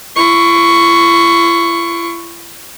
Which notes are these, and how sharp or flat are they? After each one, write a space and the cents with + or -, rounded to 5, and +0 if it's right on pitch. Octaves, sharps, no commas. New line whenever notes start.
E4 +45 C#6 +0